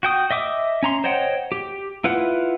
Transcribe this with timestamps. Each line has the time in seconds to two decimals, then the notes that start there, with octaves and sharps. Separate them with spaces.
0.03 F#4 G5 D#6
0.31 D#5 E5 D6 D#6
0.83 C#4 A#5 C6
1.04 C5 C#5 D#5 F#5 G5
1.52 G4
2.04 E4 F4 B4 F#5